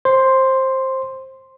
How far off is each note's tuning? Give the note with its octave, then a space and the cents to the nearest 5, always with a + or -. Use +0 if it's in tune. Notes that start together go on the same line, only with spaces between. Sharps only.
C5 +15 C6 +0